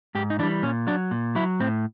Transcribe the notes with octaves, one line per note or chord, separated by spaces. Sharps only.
G#2 G4
D#4
E3 G3 D4
A#2 C#4
F#3 D4
A#2
F#3 E4
A2 C4